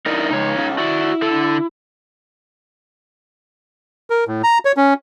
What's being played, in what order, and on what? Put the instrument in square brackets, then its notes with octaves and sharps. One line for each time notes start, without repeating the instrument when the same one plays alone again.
[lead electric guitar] D#4 E4 [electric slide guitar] A#4 D5 D#5
[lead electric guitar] C#2 [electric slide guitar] D#4 C#5
[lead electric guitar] C#4 F4
[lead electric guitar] E4 [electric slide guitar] F#4 D5
[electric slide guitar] D3 A4
[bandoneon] A#4
A2
A#5
C#5
C#4